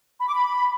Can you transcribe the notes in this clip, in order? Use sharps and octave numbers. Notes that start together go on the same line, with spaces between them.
B5
D6
B5